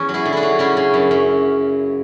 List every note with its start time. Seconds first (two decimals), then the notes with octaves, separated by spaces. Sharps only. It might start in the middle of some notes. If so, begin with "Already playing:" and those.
Already playing: E2 C#4
0.09 F#3
0.14 E4 G#4
0.25 D3
0.33 D4 E4 F#4
0.43 F#3
0.59 C#3 C#4 E4
0.77 C#3
0.94 F#2
1.11 F#2